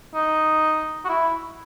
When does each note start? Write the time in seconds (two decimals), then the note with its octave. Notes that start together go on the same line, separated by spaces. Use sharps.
0.14 D#4
1.05 F#4
1.09 E4